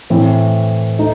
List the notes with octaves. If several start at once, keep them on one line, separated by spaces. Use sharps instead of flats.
A2 E3 C4
A3 D#4